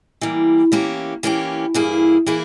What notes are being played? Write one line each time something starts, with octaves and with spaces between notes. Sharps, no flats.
E3 G3 A#3
E3 A#3 C#4 G4
E3 A#3 C#4 G4
G2 E3 A#3 E4 G#4
E3 A#3 E4 G#4